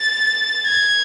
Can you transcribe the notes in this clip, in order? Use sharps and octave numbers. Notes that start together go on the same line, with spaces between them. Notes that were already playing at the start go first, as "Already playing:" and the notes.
Already playing: A6
G#6